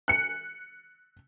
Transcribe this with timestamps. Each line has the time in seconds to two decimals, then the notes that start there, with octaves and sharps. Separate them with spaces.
0.08 F#6 C#7